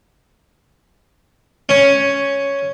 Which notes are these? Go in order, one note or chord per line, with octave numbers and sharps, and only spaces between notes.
C#4